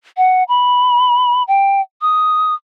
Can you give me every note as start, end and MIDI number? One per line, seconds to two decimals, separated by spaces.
0.17 0.44 78
0.49 1.43 83
1.48 1.81 79
2.02 2.55 87